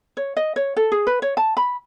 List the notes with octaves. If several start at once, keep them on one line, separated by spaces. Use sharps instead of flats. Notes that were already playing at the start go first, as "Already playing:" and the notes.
C#5
D#5
C#5
A4
G#4
B4
C#5
A5
B5